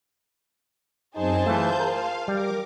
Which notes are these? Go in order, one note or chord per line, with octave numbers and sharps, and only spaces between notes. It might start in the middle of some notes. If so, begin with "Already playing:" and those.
F#2 C4 D#4 G#4 C5 A5
E3 A3 F4 G6
A#4 F5 A#5
G3 A#4 D6